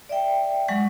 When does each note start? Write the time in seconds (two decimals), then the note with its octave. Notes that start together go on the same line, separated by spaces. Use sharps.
0.09 D5 E5 G5
0.68 F#3 G#3 F#5 C#6